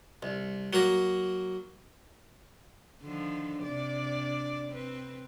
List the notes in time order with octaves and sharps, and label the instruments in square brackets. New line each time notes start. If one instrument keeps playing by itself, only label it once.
[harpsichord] C2
F#3 A#3 A#5
[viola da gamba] D3 D#3 F3
C3 D4 D5
C4 B4